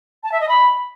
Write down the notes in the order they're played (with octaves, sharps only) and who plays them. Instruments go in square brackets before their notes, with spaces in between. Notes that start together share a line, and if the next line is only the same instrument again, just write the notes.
[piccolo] A5
E5
D#5
B5